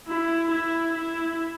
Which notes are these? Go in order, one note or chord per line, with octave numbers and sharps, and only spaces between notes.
E4
E4
E4